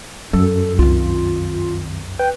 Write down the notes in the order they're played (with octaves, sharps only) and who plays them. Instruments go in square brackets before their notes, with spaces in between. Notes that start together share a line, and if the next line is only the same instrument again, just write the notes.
[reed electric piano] F#2 [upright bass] F#3 [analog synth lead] A4
[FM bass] C2 [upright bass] D#3 C4 [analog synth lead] F4
[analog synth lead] B4 [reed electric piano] G5